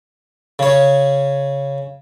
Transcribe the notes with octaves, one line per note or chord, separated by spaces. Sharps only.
C#3 C#5